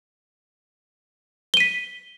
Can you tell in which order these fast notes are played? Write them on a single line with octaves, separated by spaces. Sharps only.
G7 D#7 B6